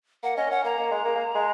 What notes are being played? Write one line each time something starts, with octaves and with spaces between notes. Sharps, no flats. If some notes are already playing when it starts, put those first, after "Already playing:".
A#3 F#5
C#4 D#5
C#4 F#5
A#3 A#5
A#3
G#3
A#3
A#3
G#3